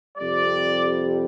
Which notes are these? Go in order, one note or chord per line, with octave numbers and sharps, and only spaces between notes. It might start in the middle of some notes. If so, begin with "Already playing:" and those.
F2 C3 G3 D5